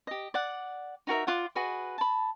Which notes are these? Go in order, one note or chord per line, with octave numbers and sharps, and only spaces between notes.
G4 D#5
D5 F#5
D#4 F#4 A#4 E5
F4 D5 F#5
F#4 G#4 B4 D#5
A5 B5